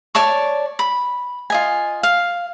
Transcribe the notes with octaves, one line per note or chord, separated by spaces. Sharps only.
C#5 D5 A5 C#6
B5
F4 D#5 G#5
F5